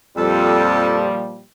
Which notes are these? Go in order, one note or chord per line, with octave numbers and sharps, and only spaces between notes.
F2 A#2 F3 G3 A4